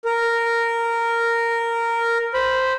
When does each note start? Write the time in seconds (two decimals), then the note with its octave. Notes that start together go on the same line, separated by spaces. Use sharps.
0.05 A#4
2.34 C5 B5